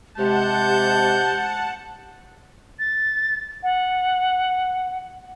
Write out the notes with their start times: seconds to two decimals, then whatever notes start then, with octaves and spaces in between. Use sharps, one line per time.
0.18 C3 G#3 G4 F#5 A5 G6
2.79 A6
3.63 F#5